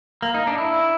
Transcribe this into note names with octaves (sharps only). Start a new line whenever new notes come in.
A#3
D#4
D4
E4